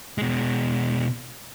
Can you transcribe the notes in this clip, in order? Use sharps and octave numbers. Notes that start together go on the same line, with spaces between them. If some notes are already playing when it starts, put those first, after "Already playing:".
B2 G#3